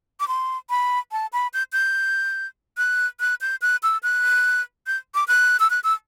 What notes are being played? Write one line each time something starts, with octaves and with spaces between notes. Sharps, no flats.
D6
C6
B5
A5
B5
G6
G6
F#6
F#6
G6
F#6
E6
F#6
G6
D6
F#6
E6
F#6
E6